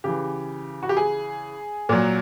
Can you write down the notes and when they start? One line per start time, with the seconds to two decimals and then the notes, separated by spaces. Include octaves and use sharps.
0.04 C#3 E3 G4
0.83 F#4
0.89 G4
0.97 G#4
1.89 A#2 F#3